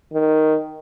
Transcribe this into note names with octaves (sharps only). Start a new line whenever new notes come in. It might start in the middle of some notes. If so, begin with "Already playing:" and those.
D#3